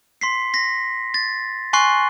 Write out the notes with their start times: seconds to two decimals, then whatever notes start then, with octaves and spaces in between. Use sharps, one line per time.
0.21 C6 B6 C7
0.54 A#6 B6
1.14 A6
1.73 G#5 C6 C#6 F#6 C7